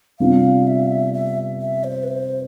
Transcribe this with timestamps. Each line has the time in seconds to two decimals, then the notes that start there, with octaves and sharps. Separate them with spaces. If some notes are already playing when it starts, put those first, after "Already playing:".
0.20 C3 G3 B3 D4 F4 F5
0.67 E5
1.14 E5
1.61 E5
1.84 C5
2.03 B4
2.08 C5